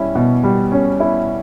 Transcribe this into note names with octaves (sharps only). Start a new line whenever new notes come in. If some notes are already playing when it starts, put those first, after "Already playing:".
Already playing: G3 C#4 E4
B2
G3
C#4
E4